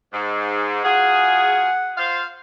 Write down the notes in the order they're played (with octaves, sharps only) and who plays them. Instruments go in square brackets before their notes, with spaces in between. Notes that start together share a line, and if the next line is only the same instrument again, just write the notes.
[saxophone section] G#2
[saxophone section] F#3 F4 G#4 [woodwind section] F#5
[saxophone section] F4 C5 F5